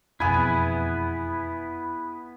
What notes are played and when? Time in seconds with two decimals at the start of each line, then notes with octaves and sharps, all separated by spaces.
0.20 E1 F2 B3 E4 G#4 B4 G#5 B5